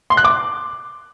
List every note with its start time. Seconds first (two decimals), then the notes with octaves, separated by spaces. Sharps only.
0.10 C6
0.17 F#6
0.24 D6